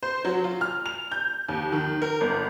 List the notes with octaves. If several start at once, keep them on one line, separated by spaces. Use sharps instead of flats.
C5
F#3
F4
F6
F7
G6
D#2
D#3
A#4
G1